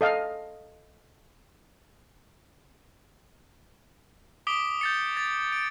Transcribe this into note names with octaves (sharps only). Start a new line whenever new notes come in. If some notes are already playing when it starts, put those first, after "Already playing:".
A4 D#5 F5
D6 D#6 B6 D7 G7
G6 A6 C#7
A6
D7